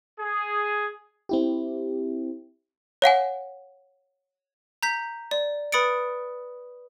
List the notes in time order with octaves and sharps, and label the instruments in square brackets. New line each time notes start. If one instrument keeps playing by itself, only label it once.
[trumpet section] G#4
[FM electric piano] C4 E4 G4
[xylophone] C#5 F5 F#5 G#5
A#5 G6 B6
D5
B4 B5 D#6 A6 C#7 D7